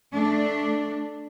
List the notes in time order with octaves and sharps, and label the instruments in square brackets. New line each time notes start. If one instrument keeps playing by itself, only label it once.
[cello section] A3 D4